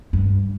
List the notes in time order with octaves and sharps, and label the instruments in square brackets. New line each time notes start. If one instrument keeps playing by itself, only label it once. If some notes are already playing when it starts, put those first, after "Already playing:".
[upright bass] G2